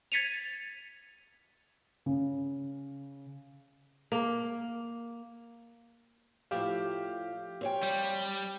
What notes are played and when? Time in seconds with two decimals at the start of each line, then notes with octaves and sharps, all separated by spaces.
0.12 G#6 A6 B6 C#7 D#7 F7
2.06 C#3
4.12 A#3
6.51 A2 F3 G4 E5 F5
7.61 C4 C#5 G5
7.83 G3